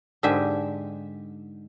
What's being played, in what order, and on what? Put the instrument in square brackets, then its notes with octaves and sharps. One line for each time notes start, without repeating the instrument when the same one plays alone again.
[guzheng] G#2 D3 G4 E5 G#5